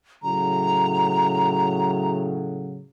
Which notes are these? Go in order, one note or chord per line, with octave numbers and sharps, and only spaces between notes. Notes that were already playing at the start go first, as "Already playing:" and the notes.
A2 C#3 F#3 A#5